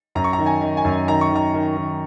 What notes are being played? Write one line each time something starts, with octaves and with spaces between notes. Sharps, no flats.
F#2 A#5
C#6
A#5
D#3
G#5
D#3
G#5
F#2
D#3 A#5
C#6
D#3 A#5
D#3
D#3